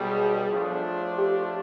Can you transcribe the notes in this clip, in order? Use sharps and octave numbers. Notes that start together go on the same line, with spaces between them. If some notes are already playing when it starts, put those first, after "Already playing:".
Already playing: B1 B2 G3 G#4
A2 F3 A3 D4 F4
G4